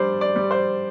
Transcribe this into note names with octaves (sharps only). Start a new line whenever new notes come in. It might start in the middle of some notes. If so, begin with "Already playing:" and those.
Already playing: G3 D4 C5 D5
D5
G3
C5